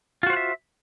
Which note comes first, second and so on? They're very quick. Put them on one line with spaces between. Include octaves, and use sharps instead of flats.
F4 F#4 C5 F#5 E5